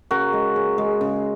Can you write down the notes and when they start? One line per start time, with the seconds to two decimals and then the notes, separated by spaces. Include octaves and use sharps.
0.11 C#3 F#4 A#4
0.33 G#3
0.56 C#3
0.78 G#3
1.01 C#3